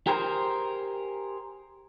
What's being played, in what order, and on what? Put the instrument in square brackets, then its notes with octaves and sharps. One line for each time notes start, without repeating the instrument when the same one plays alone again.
[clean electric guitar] G4 G#4 A#4 C5